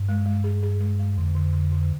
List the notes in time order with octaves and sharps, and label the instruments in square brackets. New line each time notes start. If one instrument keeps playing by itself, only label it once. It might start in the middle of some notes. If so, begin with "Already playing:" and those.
Already playing: [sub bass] G2
[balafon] G#3
G#3
G#4
G#4
G#3
G#3
[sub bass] F2 [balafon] D3
[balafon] D3
D3
D3